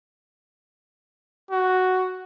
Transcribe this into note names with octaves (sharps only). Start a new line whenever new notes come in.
F#4